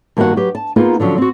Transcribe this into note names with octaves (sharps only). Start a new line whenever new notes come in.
G2 D#3 A#3 D#4 F#4 F#5
F#3 G4 B4
A5
A#3 B3 D#4 F4 G#4
D3 F3 F#3 C#4
C4 F#4